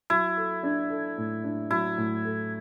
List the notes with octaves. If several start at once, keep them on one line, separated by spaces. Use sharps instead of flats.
F#3 E4
A4
D4
A4
A2
D4
F#3 E4
A2
A4